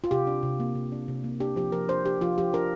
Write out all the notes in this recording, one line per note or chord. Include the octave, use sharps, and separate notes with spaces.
F4
C3 G4
D4
C3
A#3
C3
D4
C3
A#3
D4 G4
F3 G4
F3 A#4
D4 C5
D4 G4
F3 F4
F3 G4
D4 A#4